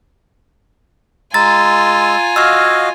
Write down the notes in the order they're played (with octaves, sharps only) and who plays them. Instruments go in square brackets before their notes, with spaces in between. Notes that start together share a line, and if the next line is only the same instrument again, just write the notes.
[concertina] G#3 E6 [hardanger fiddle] F4 G#5 [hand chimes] A#5 A6
[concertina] F#4 D#5 F5 [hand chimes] E6 F6 G#6